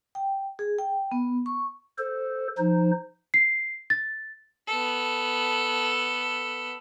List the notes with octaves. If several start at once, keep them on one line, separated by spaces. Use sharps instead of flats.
G5
G#4
G5
B3
C#6
A4 C5
F3 D#4 C5
C7
A6
B3 A4